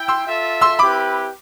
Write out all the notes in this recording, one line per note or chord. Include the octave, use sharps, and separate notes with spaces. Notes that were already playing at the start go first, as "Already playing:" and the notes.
Already playing: E4 G5
C6 E6
F4 A4 E5
C6 E6
C4 E4 G4 B4 B5 D6